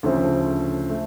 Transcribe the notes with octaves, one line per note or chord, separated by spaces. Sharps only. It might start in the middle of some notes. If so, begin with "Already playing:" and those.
D2 C#3 F3 A3 C4
A3